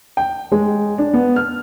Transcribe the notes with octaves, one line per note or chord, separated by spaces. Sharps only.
G5
G#3
D4
B3
F6